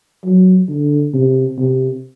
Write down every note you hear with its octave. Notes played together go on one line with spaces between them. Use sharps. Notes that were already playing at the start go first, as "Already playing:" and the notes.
F#3
D3
C3
C3